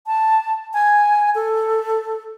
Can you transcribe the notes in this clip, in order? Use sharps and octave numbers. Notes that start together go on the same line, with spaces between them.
A5
G#5
A4